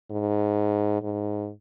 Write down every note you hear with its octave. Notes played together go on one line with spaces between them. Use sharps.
G#2
G#2